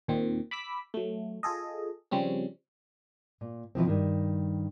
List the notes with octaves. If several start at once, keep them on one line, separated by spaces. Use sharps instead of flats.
D#2 A#2 D#3 C4
B5 D6 E6 B6
F#3 A3
F4 G#4 A4 D#5
C#3 F3 G3 C4 C#4
A#2
B2 E3 F3 C4
G2 D#3